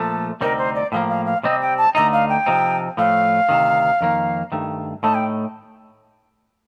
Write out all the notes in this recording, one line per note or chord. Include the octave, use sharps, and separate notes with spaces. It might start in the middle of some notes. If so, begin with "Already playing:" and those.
Already playing: A#2 F3 A3 A4
D2 C3 G3 C4 D#4 A#4
C5
D5
A2 F3 A#3 F5
F5
F5
C3 G3 C4 D#5
G5
A5
D2 D3 A3 D#4 A#5
F5
G5
C3 F3 C4 D#4
A2 F3 A3 F5
D2 C3 D#3
F2 D#3 A#3
G2 D#3 A3
A2 A3 D#4 A5
G5